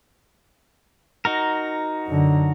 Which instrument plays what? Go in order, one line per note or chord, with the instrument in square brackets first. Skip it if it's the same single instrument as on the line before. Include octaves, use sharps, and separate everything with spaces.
[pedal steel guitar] D#4 F#4 A#4
[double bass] F#2 D3